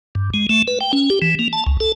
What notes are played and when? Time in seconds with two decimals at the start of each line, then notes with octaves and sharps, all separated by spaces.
0.15 G2
0.34 G#3
0.49 A3
0.68 B4
0.81 G5
0.93 C#4
1.10 G4
1.22 E3
1.39 A#3
1.53 A5
1.67 C#2
1.80 A4